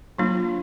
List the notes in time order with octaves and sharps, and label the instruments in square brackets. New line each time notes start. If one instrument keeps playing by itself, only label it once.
[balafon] F#3 A#3 D4 F4